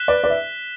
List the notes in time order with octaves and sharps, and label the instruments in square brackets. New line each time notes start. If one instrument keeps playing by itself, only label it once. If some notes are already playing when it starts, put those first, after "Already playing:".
Already playing: [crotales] F#6 B6 E7 G7
[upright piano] B4 D5
B4 D5
E5